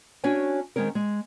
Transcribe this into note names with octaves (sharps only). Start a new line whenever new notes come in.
C#4 D4 F#4 C#5 G#5
D#3 E3 G#3 C4 C#4 A#4
G#3